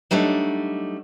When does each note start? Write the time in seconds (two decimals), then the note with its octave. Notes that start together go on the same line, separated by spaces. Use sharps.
0.11 F#3 G3 A3 D4 D#4